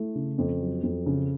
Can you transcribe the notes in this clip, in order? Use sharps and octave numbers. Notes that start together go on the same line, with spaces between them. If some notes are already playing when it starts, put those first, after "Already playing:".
Already playing: A3 E4
C#3
F2
F#3
F2
C#3